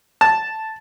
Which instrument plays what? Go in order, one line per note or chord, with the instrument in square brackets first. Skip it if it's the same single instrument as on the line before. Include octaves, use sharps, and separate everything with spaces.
[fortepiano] A5